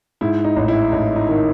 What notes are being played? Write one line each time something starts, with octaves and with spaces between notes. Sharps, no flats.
G#2 E4
D#4
A1
E4
A1 D#4
D#4
D#3